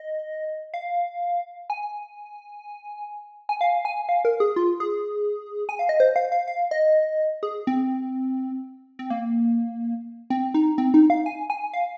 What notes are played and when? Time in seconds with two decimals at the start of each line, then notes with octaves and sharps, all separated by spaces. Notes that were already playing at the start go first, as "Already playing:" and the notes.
Already playing: D#5
0.74 F5
1.70 G#5
3.49 G#5
3.61 F5
3.85 G#5
4.09 F5
4.25 A#4
4.40 G#4
4.56 F4
4.80 G#4
5.69 G#5
5.79 F5
5.89 D#5
6.00 C5
6.16 F5
6.32 F5
6.47 F5
6.71 D#5
7.43 G#4
7.67 C4
8.99 C4
9.10 A#3
10.30 C4
10.54 D#4
10.78 C4
10.94 D#4
11.10 F5
11.26 G#5
11.50 G#5
11.74 F5